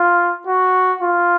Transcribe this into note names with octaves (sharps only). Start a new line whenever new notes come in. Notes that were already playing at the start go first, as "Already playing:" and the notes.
Already playing: F4
F#4
F4